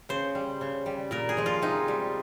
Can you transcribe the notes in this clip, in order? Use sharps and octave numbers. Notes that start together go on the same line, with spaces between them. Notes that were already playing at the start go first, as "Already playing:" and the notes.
C#3 C5
G3
C#3
G3
A#2 A#4
G#4
F3 G#3
F4
C3 D#4
G3